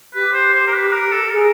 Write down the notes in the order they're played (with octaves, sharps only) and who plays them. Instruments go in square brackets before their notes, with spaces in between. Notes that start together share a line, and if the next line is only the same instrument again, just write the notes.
[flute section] G4 [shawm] B4
[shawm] C5
C5
A#4
B4
A#4
A4
[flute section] G#4 [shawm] A#4